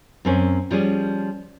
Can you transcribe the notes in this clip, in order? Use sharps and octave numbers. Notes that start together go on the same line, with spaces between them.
F#2 C4 C#4
F3 G3 C#4 G#4